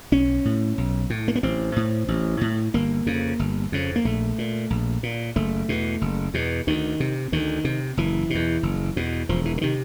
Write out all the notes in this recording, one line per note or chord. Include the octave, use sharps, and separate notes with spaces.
B1 C#4
A2
B1
A2
A#3
B3
A1 C4
A2
A1
A2
G1 A#3
F2 C#3
G1
F2 C#3
A#3
A#1 A3
A#2
A#1
A#2
F#1 A3
E2 B2
F#1
E2 B2
D2 D#3
C3
D2 D#3
C3
F#1 E3
E2 B2
F#1
E2 B2
E1 F3
E3
D3
C3 D#3